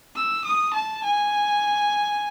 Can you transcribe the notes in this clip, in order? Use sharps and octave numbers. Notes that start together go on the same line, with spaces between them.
E6
D#6
A5
G#5